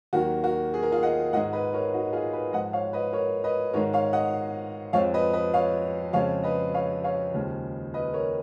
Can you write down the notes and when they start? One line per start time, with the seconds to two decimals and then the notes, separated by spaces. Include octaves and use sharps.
0.13 D#2 D#3 F#3 F#4 A#4
0.44 F#4 A#4
0.74 G#4
0.83 A#4
0.92 F4 G#4
1.03 D#5 F#5
1.33 G#2 D#3 G#3 D#5 F#5
1.53 B4 D#5
1.74 A#4 C#5
1.94 D#4 F#4
2.13 F4 G#4
2.33 G#4 B4
2.53 G#2 F3 G#3 D#5 F#5
2.73 C#5 F5
2.93 B4 D#5
3.13 A#4 C#5
3.44 B4 D#5
3.73 G#2 D#3 G#3 A#4 C#5
3.93 C#5 F5
4.13 D#5 F#5
4.93 F2 F3 G#3 C#5 F5
5.14 B4 D#5
5.33 B4 D#5
5.54 C#5 F5
6.13 F2 C#3 F3 G#3 C#5 F5
6.43 B4 D#5
6.74 C#5 F5
7.04 C#5 F5
7.34 D#2 C#3 F3 G#3
7.94 B4 D#5
8.13 A#4 C#5